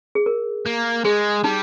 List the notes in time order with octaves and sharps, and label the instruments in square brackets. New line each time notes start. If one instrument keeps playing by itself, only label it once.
[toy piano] G#4
A#4
[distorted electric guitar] A#3
[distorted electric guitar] G#3 [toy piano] G#4
[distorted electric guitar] G3 [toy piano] D#4